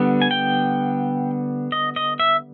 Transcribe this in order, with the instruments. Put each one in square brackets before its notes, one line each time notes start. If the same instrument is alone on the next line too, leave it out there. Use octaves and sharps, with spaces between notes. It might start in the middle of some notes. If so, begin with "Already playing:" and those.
Already playing: [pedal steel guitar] D3 G3 B3
G#5
G5
D#5
D#5
E5